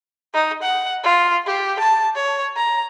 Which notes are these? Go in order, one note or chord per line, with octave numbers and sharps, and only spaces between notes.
D#4
F#5
F4
G4
A5
C#5
A#5